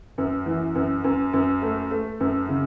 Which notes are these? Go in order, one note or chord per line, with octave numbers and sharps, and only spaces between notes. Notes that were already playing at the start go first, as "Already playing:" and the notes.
F#2
E3
F#2
F#2
F#2
A3
A3
F#2
C#3